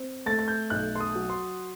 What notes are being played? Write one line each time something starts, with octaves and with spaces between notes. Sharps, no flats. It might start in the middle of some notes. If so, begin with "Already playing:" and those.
Already playing: C4
A3 A6
A6
G6
B1 F#6
C6
D#6
F#3
C6